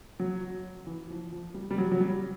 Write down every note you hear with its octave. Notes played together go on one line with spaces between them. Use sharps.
F#3
E3
F3
F3
G3
G3
F#3
F#3
G3